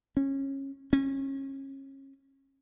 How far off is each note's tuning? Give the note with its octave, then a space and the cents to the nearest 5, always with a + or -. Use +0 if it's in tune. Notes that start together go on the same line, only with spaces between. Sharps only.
C#4 -20
C#4 -30